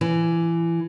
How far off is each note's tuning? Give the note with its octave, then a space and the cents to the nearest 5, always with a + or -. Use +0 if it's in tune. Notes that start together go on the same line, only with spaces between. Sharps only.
E3 +25